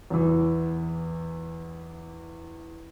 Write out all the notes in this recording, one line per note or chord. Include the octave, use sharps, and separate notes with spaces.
E2 E3